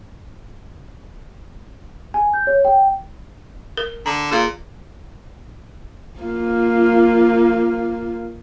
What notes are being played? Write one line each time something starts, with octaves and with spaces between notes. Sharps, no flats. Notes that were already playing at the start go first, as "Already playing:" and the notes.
G#5
G6
C#5
G5
A#4
D3 A#5
A#2 G#4 F5
A#3 F4